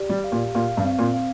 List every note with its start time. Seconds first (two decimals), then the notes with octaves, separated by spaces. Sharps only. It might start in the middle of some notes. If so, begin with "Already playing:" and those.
Already playing: G4 D5
0.09 G3
0.24 F5
0.32 A#2
0.55 A#2 F5
0.77 G2
0.84 C4
0.99 A#2
1.14 F5